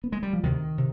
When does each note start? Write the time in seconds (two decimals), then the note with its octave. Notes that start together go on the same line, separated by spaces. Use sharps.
0.04 B3
0.12 G#3
0.23 G3
0.33 F3
0.43 D2 C3 D#3
0.78 C3